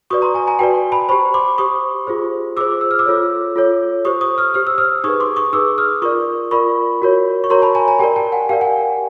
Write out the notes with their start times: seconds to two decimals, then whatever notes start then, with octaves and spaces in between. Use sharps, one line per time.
0.10 F#4 B4 D5 C#6 D#6
0.22 A#5 C6
0.34 G#5 A#5
0.47 G#5 A#5
0.59 F#4 B4 D5 G5 A5
0.92 A5 B5
1.09 G4 C5 B5 C#6
1.34 C6 D6
1.58 G4 C5 C#6 D#6
2.07 F4 G#4 C5
2.57 F4 G#4 C5 D6 E6
2.81 E6
2.91 F6
2.99 D6 E6
3.06 F4 A4 C#5
3.56 F4 A4 C#5
4.05 G4 C5 C#6 D#6
4.21 C#6 D#6
4.38 D#6 F6
4.54 G4 C5 F6
4.67 E6
4.78 D#6 F6
5.04 D#4 G#4 B4 C#6 D#6
5.20 C6 D6
5.36 C#6 D#6
5.53 D#4 G#4 B4 D6 E6
5.78 D#6 F6
6.02 F4 A#4 D5 C#6 D#6
6.51 F4 A#4 D5 B5 C#6
7.02 F#4 A#4 C#5
7.44 C#6
7.50 F#4 A#4 C#5 A#5 C6
7.62 A5 B5
7.75 G#5 A#5
7.88 G#5 A#5
7.99 G4 A#4 D5 G5 A5
8.16 G5 A5
8.32 F#5 G#5
8.49 G4 A#4 D5 F5 G5
8.61 F#5 G#5